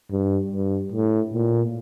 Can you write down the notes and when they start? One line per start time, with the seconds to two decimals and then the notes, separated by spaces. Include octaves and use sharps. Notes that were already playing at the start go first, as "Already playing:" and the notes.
0.11 G2
0.51 G2
0.92 A2
1.33 A#2